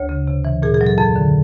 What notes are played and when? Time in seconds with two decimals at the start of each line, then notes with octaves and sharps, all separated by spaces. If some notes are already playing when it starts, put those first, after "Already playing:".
Already playing: D2 C#5
0.09 C#3
0.27 C3
0.45 E3
0.62 A#2 G#4
0.74 G#4
0.81 F#3
0.87 A4
0.98 F2 A4
1.16 D3